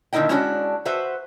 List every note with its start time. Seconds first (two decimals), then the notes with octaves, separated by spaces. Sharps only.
0.13 A#2 D3 D#3 E4 D#5 G5
0.29 G#3 C#4 D4 E4 F#4 C#5
0.85 F#4 B4 C5 E5